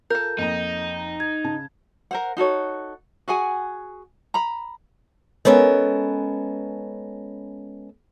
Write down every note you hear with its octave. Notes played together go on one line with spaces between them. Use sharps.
F4 A4 A#4 G6
F2 A#3 D#4 A#5
G#6
C#3 A5
A#4 C5 F#5
D#4 F#4 A4 C#5
F#4 G#4 F#5 G#5
A#5 B5
G#3 B3 C#4 A4 A#4